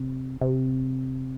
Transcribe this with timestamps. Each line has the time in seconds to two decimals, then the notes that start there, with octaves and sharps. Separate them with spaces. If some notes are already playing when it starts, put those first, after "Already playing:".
Already playing: C3
0.41 C3